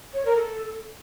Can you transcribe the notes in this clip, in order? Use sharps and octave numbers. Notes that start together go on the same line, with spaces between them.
C#5
A#4
A4